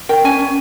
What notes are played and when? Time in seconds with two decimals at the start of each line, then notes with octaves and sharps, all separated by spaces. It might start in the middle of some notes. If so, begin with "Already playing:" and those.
0.09 A#4 G5
0.24 C#4 G#5
0.39 C#4